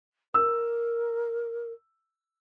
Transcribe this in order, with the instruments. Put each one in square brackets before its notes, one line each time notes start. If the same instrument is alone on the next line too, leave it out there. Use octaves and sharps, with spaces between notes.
[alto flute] A#4 [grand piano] E6